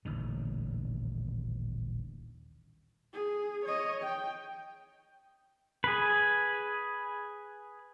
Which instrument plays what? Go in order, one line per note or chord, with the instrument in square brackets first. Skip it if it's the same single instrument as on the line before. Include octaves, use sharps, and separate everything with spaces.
[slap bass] D#1 A1 D3 D#3
[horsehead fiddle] G#4
C#5 D#5
G5
[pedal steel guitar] G#4 B4